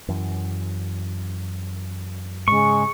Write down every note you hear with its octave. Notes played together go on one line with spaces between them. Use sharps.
F#2 E3
G#2 C#3 G#3 C#6